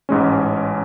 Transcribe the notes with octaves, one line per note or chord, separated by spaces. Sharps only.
A1 G#2 G#3 C#4